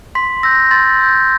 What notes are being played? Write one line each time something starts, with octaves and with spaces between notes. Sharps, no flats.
C6 B6
E6 G6 A#6
C6 A6
E6 G6